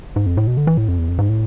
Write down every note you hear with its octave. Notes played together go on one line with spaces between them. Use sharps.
G#2
F2
A2
B2
D3
E3
A2
F2
E2
F2
G#2
A2